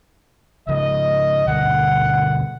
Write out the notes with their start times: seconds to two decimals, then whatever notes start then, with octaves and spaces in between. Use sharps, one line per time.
0.68 C#3 F3 D#5
1.48 B2 D3 G3 F#5